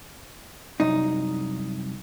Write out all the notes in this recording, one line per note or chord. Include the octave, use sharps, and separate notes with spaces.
C2 F#2 D#4